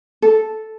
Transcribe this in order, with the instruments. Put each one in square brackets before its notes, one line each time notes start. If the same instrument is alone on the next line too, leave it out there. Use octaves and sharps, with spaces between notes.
[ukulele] A4